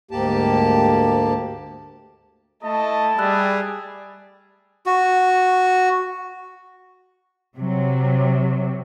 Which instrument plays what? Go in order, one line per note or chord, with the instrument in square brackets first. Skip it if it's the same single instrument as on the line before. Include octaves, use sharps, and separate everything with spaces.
[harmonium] D2 G#2 A#3 G4 A5
[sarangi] A3 [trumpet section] E4 A5 [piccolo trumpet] D#5
[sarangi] G3 [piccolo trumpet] G#4 [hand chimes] B5 E6 F#6
[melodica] F#4
[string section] C3 F#3